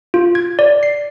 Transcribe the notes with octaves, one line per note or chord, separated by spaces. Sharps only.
F4
G#6
D5
C7